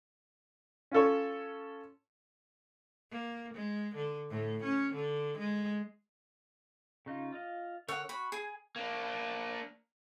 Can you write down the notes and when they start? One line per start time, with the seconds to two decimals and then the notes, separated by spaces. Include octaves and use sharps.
0.91 C#4 F4 A4 C#5
3.11 A#3
3.54 G#3
3.95 D3
4.30 A2
4.63 C#4
4.94 D3
5.38 G#3
7.06 C#3 D#4 F4
7.33 F4 D#5 F5
7.88 D3 A#4 C#5 F#5 E6
8.09 F#4 B5
8.32 G#4 G#5
8.76 A#3 D4